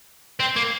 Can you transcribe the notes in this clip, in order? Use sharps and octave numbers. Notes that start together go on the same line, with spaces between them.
C4
A#3